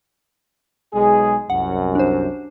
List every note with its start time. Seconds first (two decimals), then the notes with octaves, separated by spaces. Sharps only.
0.93 B1 G#3 G#4
1.50 C2 F#2 F#5
1.95 D4 C5